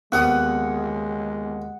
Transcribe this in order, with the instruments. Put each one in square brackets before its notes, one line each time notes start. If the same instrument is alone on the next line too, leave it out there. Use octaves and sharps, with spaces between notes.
[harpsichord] D#2 C#5 D#6 [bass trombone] G#3 [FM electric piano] B3 C4 [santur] F#5